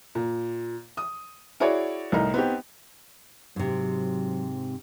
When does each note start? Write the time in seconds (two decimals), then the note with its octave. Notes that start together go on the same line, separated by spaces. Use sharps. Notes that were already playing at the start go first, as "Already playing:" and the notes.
0.15 A#2
0.97 D#6
1.60 E4 F#4 G#4 C#5 D5
2.12 C2 A2 D#4 A#4 D#5 A#5
2.34 B3 C4 D#4 G4
3.56 G#2 C3 F#3